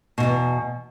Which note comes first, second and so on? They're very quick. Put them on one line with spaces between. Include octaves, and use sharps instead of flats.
B2 G2 E2